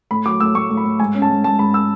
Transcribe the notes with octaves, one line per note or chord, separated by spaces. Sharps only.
A2 B5
F#3 D6
A2 E6
A2 C#6
A2
B5
A2
G#2 G#5
C#4
A5
G#2
G#2 A5
G#2 B5
E6